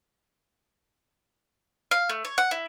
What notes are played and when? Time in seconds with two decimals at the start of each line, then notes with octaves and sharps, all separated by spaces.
1.91 F5
2.09 A3
2.25 C#5
2.38 F#5
2.51 E4